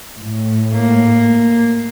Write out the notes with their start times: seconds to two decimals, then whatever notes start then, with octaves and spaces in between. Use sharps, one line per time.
0.18 A2
0.73 A#3